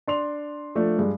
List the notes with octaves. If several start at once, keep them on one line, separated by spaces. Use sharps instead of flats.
D4 C6 F7
F3 A3 D4
G2 G#3